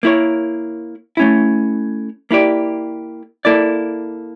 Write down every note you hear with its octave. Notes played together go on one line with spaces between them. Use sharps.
A#3 E4 A#4 C#5
A3 C#4 E4
A#3 E4 G4 D5
A#3 E4 A4 D5